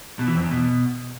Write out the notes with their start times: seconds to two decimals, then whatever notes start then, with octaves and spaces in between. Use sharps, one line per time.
0.19 B2
0.27 E3
0.35 F2
0.43 E2
0.51 B2